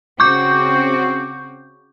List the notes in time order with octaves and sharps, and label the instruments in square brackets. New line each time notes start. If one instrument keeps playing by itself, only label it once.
[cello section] C#3 C4 F#4 [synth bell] C#6 D6 G6